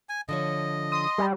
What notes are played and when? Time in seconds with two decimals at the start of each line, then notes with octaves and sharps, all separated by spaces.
0.09 G#5
0.29 D3 F3 C#5 D#5
0.92 C6 D#6
1.18 G3